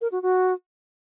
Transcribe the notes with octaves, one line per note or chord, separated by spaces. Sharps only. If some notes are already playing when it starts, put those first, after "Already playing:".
A#4
F#4
F#4